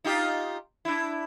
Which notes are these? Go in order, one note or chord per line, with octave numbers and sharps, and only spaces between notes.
D#4 F4 G4
D4 E4